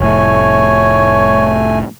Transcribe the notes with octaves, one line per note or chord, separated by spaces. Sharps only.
F1 A2 A3 C#5 G#5